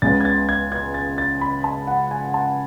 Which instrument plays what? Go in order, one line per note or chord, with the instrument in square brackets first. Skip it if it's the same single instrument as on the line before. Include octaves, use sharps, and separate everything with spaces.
[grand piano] C#2 C#3 G#3 B3 A6
G#6
A6
G#6
G#6
A6
A6
B5
A5
F#5
G#5
A5